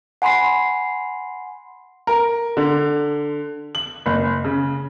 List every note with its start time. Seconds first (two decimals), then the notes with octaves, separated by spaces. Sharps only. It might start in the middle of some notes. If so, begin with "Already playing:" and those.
0.22 F#5 G#5 B5 C6 C7
2.07 A#4
2.57 D3
3.75 F#7
4.06 F#1
4.45 C#3